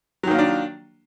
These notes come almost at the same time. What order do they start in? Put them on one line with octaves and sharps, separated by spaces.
F#3 D#3 A#3 F4 D4